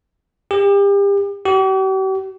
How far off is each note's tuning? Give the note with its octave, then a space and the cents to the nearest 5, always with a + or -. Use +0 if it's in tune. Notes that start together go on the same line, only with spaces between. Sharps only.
G4 +35
G4 -45